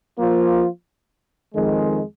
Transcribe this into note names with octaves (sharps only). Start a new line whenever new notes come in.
F3 A#3 F4
F2 D#3 G#3